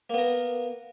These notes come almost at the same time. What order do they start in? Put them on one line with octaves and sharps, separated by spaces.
A#3 B3 A#4